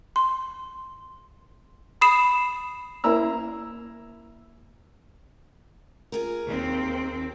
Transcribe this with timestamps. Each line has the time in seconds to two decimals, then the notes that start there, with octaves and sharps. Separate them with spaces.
0.16 C6
2.01 B5 D#6 C7 E7
3.04 A#3 E4 A#5 E6
6.12 F4 G#4 A#4
6.46 D#2 C4